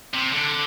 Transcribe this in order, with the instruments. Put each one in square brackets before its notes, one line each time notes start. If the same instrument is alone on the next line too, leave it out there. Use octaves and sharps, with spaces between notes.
[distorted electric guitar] C3
D3